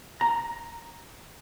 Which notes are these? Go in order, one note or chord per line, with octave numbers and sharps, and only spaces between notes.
A#5